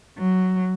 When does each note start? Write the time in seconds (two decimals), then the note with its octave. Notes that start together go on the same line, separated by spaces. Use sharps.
0.18 F#3